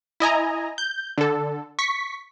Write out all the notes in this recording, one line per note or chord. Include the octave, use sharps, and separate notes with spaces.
E4 D#5 G#5 A#5
G6
D3 A4
C#6 B6